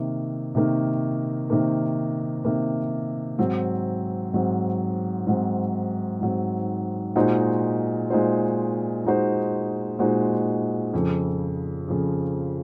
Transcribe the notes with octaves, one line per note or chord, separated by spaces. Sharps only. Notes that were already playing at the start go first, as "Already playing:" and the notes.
Already playing: C3 D#3 A#3
C3 D#3 A#3
C3 D#3 A#3
C3 D#3 A#3
G#2 F#3 C4
G#2 F#3 C4
G#2 F#3 C4
G#2 F#3 C4
A#2 G#3 D#4 F#4 C5
A#2 G#3 D#4 F#4 C5
A#2 G#3 D#4 F#4 C5
A#2 G#3 D#4 F#4 C5
F2 C#3 F3
F2 C#3 F3